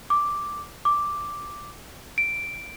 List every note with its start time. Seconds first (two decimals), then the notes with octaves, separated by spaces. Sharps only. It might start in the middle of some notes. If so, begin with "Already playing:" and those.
0.10 D6
0.85 D6
2.18 D7